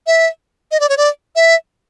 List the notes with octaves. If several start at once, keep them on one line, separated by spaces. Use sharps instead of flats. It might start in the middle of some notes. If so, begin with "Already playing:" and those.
E5
D#5
D5
C#5
D5
E5